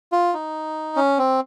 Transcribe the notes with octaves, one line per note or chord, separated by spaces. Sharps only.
F4
D#4
C#4
C4